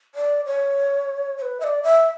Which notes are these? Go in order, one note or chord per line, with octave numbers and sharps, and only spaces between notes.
D5
C#5
C#5
B4
E5
D5
E5